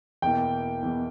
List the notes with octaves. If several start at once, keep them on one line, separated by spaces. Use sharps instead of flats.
E2 B2 A#3 E4 G5
E2 B2 A#3 E4